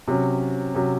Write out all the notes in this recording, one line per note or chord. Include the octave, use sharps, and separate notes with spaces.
C3 F#3 C#4
C3 F#3 C#4